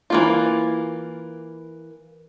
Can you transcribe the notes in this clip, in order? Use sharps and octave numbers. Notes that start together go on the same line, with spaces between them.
E3 A#3 F4